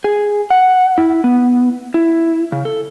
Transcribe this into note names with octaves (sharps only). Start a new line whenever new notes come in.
G#4
F#5
E4
B3
E4
C#3
A4